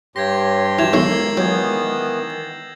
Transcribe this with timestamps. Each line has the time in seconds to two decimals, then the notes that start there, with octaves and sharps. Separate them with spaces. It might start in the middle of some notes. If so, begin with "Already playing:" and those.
0.16 G2 G4 C#5 C6 G#6 A#6
0.79 E3 F#4 G#6 E7 F7
0.93 B1 D#3 G#3 C#5 E6 C7 F#7
1.05 A#3
1.37 D#3 E3 F#3 B3 G6 G#6